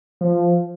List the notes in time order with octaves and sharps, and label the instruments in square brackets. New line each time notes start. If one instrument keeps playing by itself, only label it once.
[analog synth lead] F3